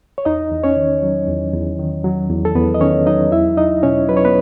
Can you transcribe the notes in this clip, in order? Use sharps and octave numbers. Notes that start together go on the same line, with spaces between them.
C#5
E2 D#4 D#5
E2
C#4 C#5
D#3
F#3
E2
E2
D#3
F#3
E2
A4
E2 B3 B4
D#5
D#3 C#4 C#5
F#3 D#4 D#5
E2 E4 E5
E2 D#4 D#5
B2 C#4 C#5
F#3 B4
C#5
B3 B4